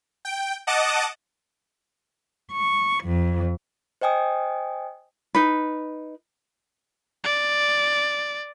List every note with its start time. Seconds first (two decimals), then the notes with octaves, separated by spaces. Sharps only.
0.25 G5
0.67 D#5 F#5 A5 D6 D#6
2.51 C#6
3.04 F2
4.01 C5 D#5 G5 G#5 D#6
5.35 D#4 B4
7.24 D5